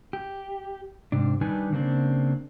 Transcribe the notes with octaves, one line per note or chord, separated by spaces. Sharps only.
G4
G#2 C3 D4
D#3 G3 D4 D#4 B4 G#5
C#3 A#3 C4 D4